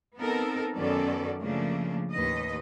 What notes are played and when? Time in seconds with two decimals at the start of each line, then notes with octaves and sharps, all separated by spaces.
0.17 B3 C4 D#4 A4 A#4
0.76 F#2 D#3 B3 C#4 A4 D5
1.40 C#3 F3 A3 A#3 D4
2.12 D#2 A2 B4 D#5